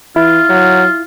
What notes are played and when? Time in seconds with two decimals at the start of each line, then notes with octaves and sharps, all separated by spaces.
0.16 E3 E4 F4
0.50 F#3